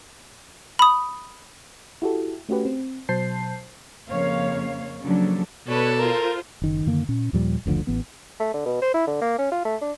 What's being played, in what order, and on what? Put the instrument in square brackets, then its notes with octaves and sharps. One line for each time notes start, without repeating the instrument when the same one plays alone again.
[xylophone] B5 D#6
[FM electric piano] E4 F#4 G4 A4
A3 C#4 F#4 G4 B4
C4
B2 F#3 C5 A5 G6 C7
[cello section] F2 C#3 A#3 C#5 F5
C#3 F3 F#3 A#3 D4 A4
[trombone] B2 [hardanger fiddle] A4 [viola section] B4 C#5 D5
[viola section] F4 C5 [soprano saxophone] A#4
[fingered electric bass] F#1 D#3
F#2 D3 D#3 A#3
A#2 C#4
D#2 A#2 F3 G3
F#1 D2 D3 F3
A1 E3 B3
[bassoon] A3
D3
B2
C5
E4
D3
A#3
C#4
F4
A3
D4